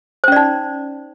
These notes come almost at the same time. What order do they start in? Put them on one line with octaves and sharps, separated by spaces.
C5 C#4 D5 D#4